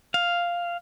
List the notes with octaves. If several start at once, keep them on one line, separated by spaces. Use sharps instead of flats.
F5